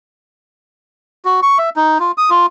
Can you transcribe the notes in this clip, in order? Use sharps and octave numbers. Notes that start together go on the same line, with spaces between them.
F#4
C#6
E5
D#4
F4
D#6
F4